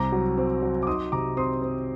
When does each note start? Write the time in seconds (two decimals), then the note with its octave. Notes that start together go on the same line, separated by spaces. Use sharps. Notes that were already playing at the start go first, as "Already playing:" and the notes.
Already playing: C2 C4 A#5 D6
0.12 F#3
0.38 C4
0.62 F#3
0.83 D6
0.87 D#4 C6 D#6
1.12 C3 A#5 D6
1.37 C4 C6 D#6
1.62 C4